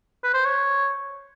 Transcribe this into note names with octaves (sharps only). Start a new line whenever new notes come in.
B4
C5
C#5